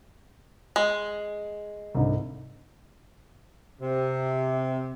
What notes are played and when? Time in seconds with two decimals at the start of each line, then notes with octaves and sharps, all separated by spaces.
0.76 G#3
1.95 C2 G#2 D3
3.82 C3